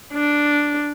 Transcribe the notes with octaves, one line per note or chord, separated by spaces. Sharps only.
D4